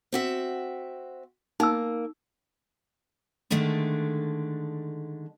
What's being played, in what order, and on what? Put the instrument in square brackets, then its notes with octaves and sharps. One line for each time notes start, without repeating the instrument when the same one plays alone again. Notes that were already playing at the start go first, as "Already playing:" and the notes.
[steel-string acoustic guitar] C4 F#4 E5
[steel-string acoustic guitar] A#3 [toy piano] D#4 E6
[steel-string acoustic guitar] D3 D#3 G#3 A3 D4